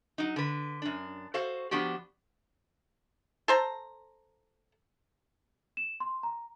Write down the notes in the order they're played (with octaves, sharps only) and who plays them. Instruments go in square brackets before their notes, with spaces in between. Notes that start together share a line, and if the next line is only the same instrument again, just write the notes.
[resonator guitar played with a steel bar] F#3 D#4
D3 B4
F#2 D4
F#4 A4 C5 F5
F3 B3 D4 F#4 G4
[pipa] A4 C5 A#5
[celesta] E7
C6
A#5